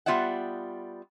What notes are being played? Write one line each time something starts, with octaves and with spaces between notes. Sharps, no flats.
G3 B3 F4 D5 E5 F#5